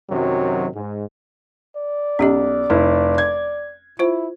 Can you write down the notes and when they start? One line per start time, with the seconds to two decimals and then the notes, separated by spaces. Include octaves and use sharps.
0.10 F#2 C3 D#3 F#3
0.74 G#2
1.76 D5
2.19 B1 C#4 G4 D#5
2.70 F1 E4
3.18 G#6
3.99 E4 F4 C5